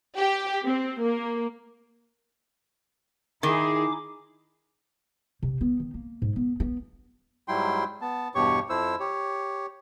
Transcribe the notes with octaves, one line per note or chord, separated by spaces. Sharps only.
G4
C4
A#3
D#3 D#4 E4 G#4 D6
C3
B3
D#3
A#3
G#2
B3
B3
G#2 F#3 G3 E4 G5 C6
B3 A5
E2 G2 B2 G4 C#5 C#6
F2 F3 E4 C5 E6
G4 C#5